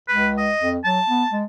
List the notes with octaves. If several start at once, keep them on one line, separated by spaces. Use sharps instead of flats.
C#2 B4
D#5
F2
F#3 A5
B3
G#3